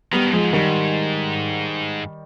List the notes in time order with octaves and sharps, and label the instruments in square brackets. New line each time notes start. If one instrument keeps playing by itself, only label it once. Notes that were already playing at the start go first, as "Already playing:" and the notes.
[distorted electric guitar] D#3 [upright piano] G3 B3
[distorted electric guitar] B2
[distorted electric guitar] G#2 [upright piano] F3 G#3
[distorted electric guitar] G#2 [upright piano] D#3 G3